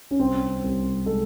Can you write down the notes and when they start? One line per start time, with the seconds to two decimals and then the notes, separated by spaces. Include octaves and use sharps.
0.11 C#4
0.19 C2 C4
0.63 C2
1.06 G#3 A4